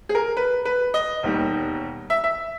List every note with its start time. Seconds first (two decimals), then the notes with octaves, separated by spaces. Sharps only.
0.09 G#4
0.15 A#4
0.37 B4
0.65 B4
0.94 D#5
1.23 E1 D#2 D#3 G3
2.10 E5
2.24 E5